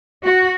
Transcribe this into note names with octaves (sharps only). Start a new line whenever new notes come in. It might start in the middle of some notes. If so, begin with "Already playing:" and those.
F#4